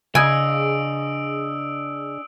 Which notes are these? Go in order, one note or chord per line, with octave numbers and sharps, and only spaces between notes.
C#3 D4 G#4 D#5 G#5 D#6 E6 D7